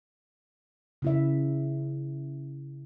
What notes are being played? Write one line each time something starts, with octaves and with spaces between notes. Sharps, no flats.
C#3 E4 E5